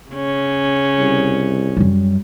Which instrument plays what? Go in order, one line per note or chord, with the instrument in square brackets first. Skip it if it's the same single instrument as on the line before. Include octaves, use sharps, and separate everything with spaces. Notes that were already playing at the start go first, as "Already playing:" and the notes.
[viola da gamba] C#3 C#4
[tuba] C2
[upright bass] F#2 G3